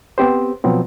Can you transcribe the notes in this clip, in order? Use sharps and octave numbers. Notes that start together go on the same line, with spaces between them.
B3 C4 G4 C5
B2 F3 F#3 B3 C4